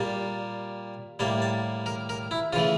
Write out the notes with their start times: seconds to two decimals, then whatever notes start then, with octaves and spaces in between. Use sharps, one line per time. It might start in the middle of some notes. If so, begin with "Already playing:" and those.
Already playing: A#2 G3 A#3 A5
1.19 A2 G3 A#3 A5
1.42 A5
1.86 A#4
2.09 A#4
2.31 E4
2.53 C#3 F4
2.56 E3 A3